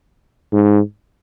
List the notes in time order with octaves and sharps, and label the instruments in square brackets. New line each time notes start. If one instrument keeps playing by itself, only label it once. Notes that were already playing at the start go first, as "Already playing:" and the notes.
[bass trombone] G#2